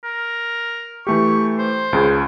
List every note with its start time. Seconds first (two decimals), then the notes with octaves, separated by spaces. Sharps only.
0.04 A#4
1.07 E3 A3 G4 C#6
1.59 C5
1.93 C#2 C#3